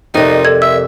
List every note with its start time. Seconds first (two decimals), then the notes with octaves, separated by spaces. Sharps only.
0.14 F2 C3 D#4 A#4 D5
0.45 A4 G#6
0.62 E5 E6